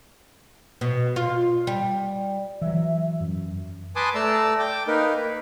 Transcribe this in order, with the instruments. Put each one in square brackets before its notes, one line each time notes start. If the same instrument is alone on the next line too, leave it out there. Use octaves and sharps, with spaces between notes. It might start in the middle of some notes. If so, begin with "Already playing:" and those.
[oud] B2
F4
G3
[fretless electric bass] E3 F#3 [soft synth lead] E5
[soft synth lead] F#2
[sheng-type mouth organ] B4 G#5 A5 C6 D6 D#6
A3 D5 A5 A#5 E6
G5 D6
A#3 D#4 A#4 B4
B4